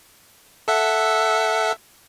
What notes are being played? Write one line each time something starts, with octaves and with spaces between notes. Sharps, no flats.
A4 E5 F#5